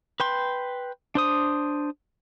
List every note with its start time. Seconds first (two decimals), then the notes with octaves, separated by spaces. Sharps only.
0.20 B4 G5 C6
1.15 D4 C5 D#6